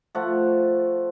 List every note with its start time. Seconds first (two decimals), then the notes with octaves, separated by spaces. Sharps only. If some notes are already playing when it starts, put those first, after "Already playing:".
0.15 F3 A3 F#5